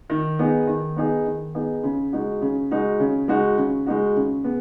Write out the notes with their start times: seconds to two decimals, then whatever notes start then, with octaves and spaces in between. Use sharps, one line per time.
0.10 D#3
0.39 B3 D#4 G#4
0.67 D#3
0.96 B3 D#4 G#4
1.26 D#3
1.55 B3 D#4 G#4
1.83 C#3
2.13 G#3 D#4 F#4
2.41 C#3
2.71 G#3 D#4 F#4
2.99 C#3
3.28 G#3 D#4 F#4
3.57 C#3
3.86 G#3 D#4 F#4
4.16 C#3
4.44 B3 G#4